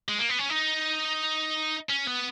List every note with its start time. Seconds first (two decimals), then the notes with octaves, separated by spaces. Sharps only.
0.09 G#3
0.19 A#3
0.29 B3
0.39 C#4
0.50 D#4
1.89 C#4
2.07 B3